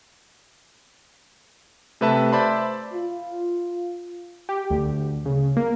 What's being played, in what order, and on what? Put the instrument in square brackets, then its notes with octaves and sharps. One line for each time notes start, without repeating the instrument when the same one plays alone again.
[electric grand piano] C3 A3 B4 E5 A5
C5 D5 E5 A5 B5 C6
[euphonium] F4
[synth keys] G4
D2
C#3
A#3